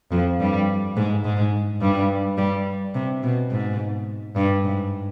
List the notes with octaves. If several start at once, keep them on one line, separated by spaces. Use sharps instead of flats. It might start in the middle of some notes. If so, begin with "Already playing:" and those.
F2 F3
G2 G3
G#2 G#3
G#2 G#3
G2 G3
G2 G3
C3
B2
G#2
G2
G#2